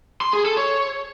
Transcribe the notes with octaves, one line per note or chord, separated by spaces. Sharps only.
C6
G#4
A4
C#5